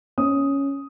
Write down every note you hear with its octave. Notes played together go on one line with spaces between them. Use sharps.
C#4 D#6